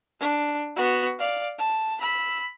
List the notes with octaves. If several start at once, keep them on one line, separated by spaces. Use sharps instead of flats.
D4
B3 F#4
D5 F5
A5
B5 E6